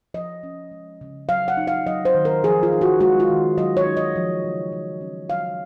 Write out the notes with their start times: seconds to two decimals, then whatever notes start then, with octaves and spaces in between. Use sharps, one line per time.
0.14 F3 D#5
0.43 C#4
0.71 G#3
1.01 C#3
1.29 F#3 F5
1.48 F#5
1.57 D#4
1.67 F5
1.87 F#3 D#5
2.05 C5
2.15 D#3
2.25 A#4
2.43 F3 G#4
2.63 F4
2.73 D#4
2.81 F#4
3.00 G#3 F#4
3.20 F4
3.30 D#3
3.58 F#3 D#5
3.77 C#5
3.86 D#4
3.97 D#5
4.16 F3
4.44 C#3
4.72 F3
5.01 C#4
5.30 F#3 F5